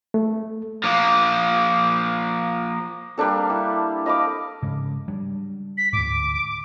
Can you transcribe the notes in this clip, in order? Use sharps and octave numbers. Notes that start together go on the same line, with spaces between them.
A3
F3 A#3
G3 A#3 D4 A4
E4
D#5 F5 B5 D6
G#2 C#3 G#3
F#3 G3 D4
B6
D2 G#2 D6